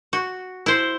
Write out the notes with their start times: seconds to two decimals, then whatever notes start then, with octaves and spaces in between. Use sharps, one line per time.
0.13 F#4
0.66 E4 C5